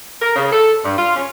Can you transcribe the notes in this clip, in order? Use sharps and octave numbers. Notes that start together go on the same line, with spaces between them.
A#4
C#3
A4
G2
F4
C#4